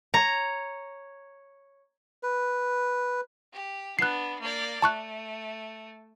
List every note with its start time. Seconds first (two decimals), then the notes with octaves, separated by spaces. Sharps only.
0.14 C#5 A#5
2.23 B4
3.53 G4
3.99 B3 D4 F#6 C7
4.41 A#3 D5
4.82 A3 A5 C#6 F#6